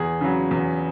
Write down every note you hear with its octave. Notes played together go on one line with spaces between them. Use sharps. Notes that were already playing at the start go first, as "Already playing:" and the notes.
Already playing: E2 G#4
C#3 F#3
E2